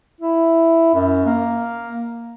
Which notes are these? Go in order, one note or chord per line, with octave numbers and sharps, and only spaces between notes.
E4
F#2
A#3